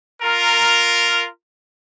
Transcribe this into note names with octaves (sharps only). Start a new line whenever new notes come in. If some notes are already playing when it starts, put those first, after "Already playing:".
F4 A#4